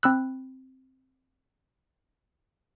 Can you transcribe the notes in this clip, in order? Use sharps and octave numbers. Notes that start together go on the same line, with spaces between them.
C4 B5 E6 F#6